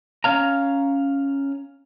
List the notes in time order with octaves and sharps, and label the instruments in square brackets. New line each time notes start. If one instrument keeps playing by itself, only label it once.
[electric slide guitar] C#4 C#5 F5 A#5